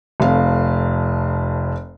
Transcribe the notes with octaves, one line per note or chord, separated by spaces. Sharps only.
F1 F2 F5